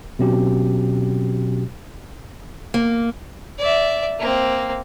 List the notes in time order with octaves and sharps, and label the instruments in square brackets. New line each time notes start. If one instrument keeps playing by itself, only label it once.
[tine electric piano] B2 F#3 C4 C#4 F#4 G4
[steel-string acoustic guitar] A#3
[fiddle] D5 E5
A#3 C4